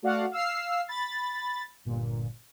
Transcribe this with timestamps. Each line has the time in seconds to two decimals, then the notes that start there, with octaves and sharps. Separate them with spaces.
0.02 A3 F#4 D5 F5 F#5
0.31 F5 E6 F6 C7
0.88 B5 A6
1.85 G1 A#2